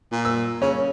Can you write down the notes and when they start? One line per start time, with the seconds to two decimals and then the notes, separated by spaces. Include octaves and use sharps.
0.12 A#2
0.25 E6
0.62 C#3 C#4